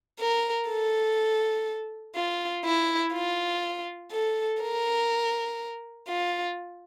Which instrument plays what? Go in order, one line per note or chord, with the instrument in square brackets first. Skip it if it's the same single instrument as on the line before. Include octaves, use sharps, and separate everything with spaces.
[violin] A#4
A4
F4
E4
F4
A4
A#4
F4